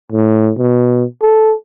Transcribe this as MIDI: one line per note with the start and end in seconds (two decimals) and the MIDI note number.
0.12 0.51 45
0.58 1.04 47
1.22 1.54 69